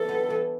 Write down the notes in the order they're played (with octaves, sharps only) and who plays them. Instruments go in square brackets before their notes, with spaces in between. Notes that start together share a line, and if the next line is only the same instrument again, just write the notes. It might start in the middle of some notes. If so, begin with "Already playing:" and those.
Already playing: [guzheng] E3 D4 [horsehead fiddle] A4
[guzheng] G3 B3
E3